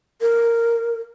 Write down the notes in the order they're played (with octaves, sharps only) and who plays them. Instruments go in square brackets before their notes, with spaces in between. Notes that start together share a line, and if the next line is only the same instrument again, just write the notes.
[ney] A#4